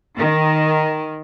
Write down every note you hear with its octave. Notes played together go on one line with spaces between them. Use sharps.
D#3